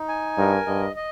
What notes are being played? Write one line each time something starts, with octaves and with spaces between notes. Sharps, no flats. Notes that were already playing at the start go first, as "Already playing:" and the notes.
Already playing: D#4
G#5
G2 A#4
G2 D#5
D#5